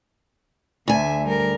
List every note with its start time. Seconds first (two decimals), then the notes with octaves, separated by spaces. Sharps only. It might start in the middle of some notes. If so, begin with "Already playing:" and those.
0.88 D2 D3 E5 G#5
1.25 G3 A#4